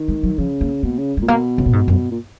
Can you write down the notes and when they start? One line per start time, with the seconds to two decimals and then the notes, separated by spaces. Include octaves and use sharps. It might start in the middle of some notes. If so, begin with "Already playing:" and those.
Already playing: D#3
0.08 G#3
0.23 F#3
0.38 C#3 F3
0.61 A#3
0.83 B2 A#3
0.98 C#3
1.17 A#2 G#3
1.28 B2 A#3
1.58 C#3
1.66 A#2
1.73 G#2
1.88 F#2
2.11 A#2